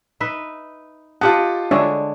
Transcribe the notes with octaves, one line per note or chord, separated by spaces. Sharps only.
D#4 B4 E5
F4 G4 D#5 F#5 A5
D3 G#3 D4 C#5 E5